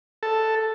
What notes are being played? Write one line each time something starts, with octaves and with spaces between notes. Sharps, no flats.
A4